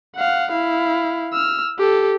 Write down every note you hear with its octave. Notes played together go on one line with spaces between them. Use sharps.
F5 F#5
E4 F5
E6 F6
G4 A4